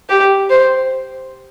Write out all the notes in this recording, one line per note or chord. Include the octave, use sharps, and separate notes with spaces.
G4
C5